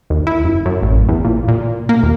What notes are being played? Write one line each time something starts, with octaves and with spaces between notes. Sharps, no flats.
D#2
E4
F#1
F#2
A1
E2
A#2
A#2
A#3
D#2